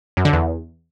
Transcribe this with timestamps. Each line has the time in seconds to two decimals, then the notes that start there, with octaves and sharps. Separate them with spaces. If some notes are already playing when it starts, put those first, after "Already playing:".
0.17 F#2
0.25 D3
0.33 E2